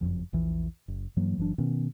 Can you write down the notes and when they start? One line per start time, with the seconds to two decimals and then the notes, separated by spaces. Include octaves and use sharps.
0.01 F#1 C2 F2 F3
0.33 A#1 E2 E3
0.88 F#1
1.17 G2 E3 F#3 A#3
1.38 F#1 E3 F#3 D4
1.58 B2 D#3 B3 C#4